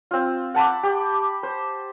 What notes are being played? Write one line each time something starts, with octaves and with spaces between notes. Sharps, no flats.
C4 F4
F#5 A5 B5 D6
G4
C5